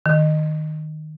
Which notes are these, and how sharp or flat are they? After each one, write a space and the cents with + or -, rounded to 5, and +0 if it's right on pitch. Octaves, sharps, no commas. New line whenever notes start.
D#3 -10